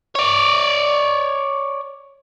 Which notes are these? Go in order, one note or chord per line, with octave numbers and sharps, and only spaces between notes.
C#5 D5